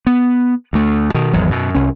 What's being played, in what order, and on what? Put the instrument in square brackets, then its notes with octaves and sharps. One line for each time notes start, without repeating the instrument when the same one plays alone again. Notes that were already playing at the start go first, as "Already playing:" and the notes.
[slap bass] B3
D2 A3
B2 D#3
G#1 E2 F#3
F#2 B2
C2 C#4